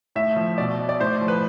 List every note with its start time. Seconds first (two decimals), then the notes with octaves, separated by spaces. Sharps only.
0.16 A2 E5
0.36 F3
0.58 B2 D5
0.89 D5
1.00 A2 C5
1.21 F3
1.28 B4